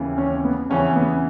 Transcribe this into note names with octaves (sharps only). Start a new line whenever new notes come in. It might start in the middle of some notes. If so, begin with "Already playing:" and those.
Already playing: D#2 C#3 E3
C#4
B3
E2 C#3 E3 C#4
B3